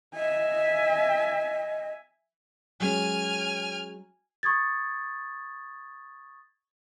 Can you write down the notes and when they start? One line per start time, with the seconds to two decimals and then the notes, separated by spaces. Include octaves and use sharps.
0.14 D#5 E5 G#5
2.80 F#3 G#3 C#4 G#5 F6
4.43 C#6 D#6 G#6 A6